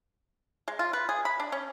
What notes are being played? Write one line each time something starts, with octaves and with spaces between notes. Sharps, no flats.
G#3
F4
B4
G#4
B5
D4
C#4